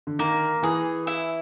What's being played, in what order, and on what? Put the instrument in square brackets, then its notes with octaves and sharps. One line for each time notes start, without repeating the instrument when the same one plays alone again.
[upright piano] D3
[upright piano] D#3 [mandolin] A#3
[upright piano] E3 [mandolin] G#4
[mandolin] E4